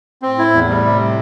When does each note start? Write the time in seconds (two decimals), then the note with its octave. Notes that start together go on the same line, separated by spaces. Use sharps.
0.22 A2 C4
0.39 E4
0.54 E2 A2
0.69 G3
0.85 C3